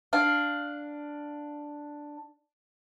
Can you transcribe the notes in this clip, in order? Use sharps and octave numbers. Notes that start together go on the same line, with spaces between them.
D4 F5